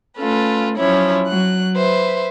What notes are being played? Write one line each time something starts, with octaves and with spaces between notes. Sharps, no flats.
A3 C#4 F4 A4 B4
F3 F#3 C#4 E4 C#5
F#3 F#6
B4 C5 E5